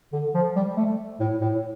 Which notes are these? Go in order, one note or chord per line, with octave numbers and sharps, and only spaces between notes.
D3
F3
G3
A3
A2
A2